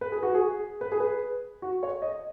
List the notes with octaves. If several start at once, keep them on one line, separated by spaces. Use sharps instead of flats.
B4
G#4
F#4
G#4
B4
G#4
B4
F#4
C#5
D#5